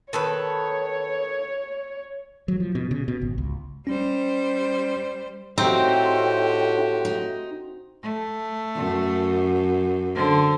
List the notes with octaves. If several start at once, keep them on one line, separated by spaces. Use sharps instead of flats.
D#3 A4 B4 C#5
F#3
F3
B2
C#3
B2
G#1
C#2
G3 C#4 C5
A2 C4 D#4 F#4 G4
D#4
A3
F#2
D3 C5